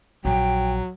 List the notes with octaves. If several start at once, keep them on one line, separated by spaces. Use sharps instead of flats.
A#1 F#3 G5